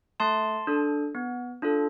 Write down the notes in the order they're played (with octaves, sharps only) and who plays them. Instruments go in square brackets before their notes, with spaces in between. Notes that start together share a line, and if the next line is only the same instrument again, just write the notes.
[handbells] A3 A5 C6
D4 A4
B3
D4 F4 A4